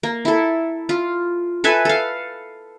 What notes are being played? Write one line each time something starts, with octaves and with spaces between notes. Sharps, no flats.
A#3
E4 A4
F4
A4 B4 E5 G#5
A4 F5